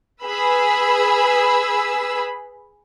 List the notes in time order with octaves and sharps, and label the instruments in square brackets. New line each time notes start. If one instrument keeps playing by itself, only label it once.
[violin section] G#4 B4 B5 E6